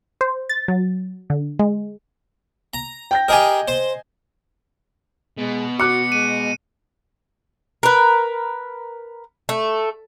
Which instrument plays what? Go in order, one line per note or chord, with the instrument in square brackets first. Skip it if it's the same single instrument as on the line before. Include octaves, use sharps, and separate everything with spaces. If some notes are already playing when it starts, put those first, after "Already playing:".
[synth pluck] C5
A6
F#3
D3
G#3
[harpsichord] A#5
[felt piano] G5 G6 A#6
[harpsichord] G4 G#4 A#4 [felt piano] D#5 G#5
[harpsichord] C5
[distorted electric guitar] B2 [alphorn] G#3
[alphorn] F#4 [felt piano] D6 F#6 [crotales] C#7
[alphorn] G#3 [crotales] D#7
[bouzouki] A#4 B4
A3